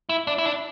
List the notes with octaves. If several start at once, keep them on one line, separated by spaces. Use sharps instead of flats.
E4
D4
E4
D4